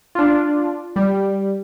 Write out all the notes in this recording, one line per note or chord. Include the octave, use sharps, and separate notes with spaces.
D4 F4
G3